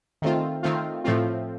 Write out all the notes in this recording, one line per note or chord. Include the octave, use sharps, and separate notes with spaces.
D#3 A3 C4 F4
D#3 A3 C4 F4
A2 F3 A3 C4 F4